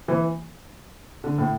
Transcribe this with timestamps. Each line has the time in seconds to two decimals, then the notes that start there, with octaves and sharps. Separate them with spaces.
0.08 E3
1.24 D3
1.38 A2